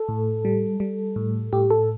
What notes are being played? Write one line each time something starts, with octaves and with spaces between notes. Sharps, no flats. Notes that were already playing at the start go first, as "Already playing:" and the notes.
Already playing: A4
A2
G3
G3
A2
A2 G4
A4